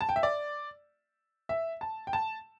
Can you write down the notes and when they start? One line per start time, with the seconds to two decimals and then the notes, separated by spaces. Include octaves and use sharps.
0.01 A5
0.09 G5
0.16 E5
0.23 D5
1.49 E5
1.81 A5
2.07 G5
2.13 A5